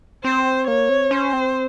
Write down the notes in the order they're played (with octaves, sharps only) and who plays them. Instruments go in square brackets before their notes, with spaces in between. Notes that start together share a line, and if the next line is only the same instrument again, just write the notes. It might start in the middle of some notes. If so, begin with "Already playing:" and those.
[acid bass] C4 [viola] C5
[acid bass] A#3 [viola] C#5
[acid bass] C4
[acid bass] C#4 [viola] C5
[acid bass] C4